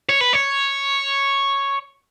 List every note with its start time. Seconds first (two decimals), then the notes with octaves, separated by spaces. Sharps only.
0.09 C#5
0.21 B4
0.33 C#5